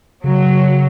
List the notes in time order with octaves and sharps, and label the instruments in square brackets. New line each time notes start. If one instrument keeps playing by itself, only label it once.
[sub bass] C#3 [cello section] F#3